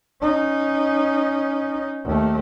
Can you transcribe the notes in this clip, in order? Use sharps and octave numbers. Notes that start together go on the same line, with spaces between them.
C#4 D#4
D#2 A3